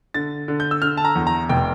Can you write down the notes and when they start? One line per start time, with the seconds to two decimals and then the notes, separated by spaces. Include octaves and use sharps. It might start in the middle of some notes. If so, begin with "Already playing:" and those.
0.14 D3 A6
0.48 D3
0.60 G6
0.71 E6
0.82 D3 F6
0.97 A5
1.05 A#5
1.15 E2
1.27 A#5
1.49 F1 G5